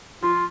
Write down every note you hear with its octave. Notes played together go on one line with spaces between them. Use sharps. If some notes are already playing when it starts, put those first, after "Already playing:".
F3 F4